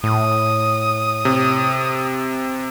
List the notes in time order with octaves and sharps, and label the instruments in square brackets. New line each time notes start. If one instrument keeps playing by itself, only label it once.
[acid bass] A2 [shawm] D#6
[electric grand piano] C3